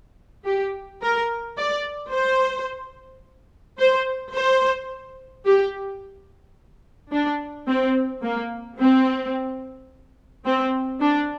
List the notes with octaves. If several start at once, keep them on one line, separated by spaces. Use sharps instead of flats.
G4
A#4
D5
C5
C5
C5
G4
D4
C4
A#3
C4
C4
D4